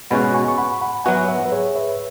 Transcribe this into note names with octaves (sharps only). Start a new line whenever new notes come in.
B2 G#3 C#4 F#4 F#5 B5
G#5 C#6
C#6
F#5 B5
F#5 B5
F#3 B3 F#4 E5 G#5
B4 E5
B4
G#4 C#5
B4 E5